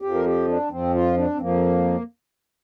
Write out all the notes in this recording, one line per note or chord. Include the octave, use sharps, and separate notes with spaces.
F2 F3 G4
A#4
G4
D4
F2 F3 C4
F4
D4
C4
F2 F3 A#3